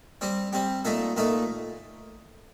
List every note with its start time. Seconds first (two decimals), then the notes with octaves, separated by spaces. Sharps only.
0.21 G3 C4 G4
0.53 G3 C4 G4
0.85 A#2 A3 D#4 A4
1.17 A#2 A3 D#4 A4